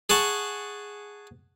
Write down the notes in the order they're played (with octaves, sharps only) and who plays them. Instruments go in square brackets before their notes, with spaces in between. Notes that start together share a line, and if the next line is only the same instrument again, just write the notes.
[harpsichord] G#4 F#5 A5 C#6